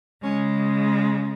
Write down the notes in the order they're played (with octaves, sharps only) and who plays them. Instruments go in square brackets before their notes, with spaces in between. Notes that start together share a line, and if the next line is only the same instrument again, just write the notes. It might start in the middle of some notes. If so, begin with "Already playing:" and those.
[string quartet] C#3 G#3 C#4